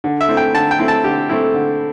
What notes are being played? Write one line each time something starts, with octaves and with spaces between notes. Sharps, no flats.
D3
E5
A3 C4 E4
G5
D3 A5
G5
A3 C4 E4
A5
D3 G4
A3 C4 E4
D3